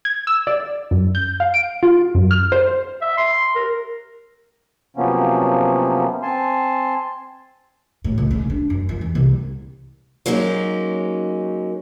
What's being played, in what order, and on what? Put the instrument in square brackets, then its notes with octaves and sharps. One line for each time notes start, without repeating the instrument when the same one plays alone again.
[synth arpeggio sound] G#6
E6
D5
F#2
G6
F5
D7
F4
F#2
F6
C5
[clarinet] E5
C6
A#4
[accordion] C3 F3 F#3 A#3 B3 C#4
C4 G#5 A5 C6
[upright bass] A2
C#2
C#3
D4
F#2
F3
E2
C2
[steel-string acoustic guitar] F#3 G#3 A#3 C#4 D#4